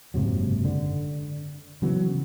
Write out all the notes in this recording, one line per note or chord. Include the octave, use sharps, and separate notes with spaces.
F#1 G#2 C3 F#3
D3
C#3 E3 F#3 B3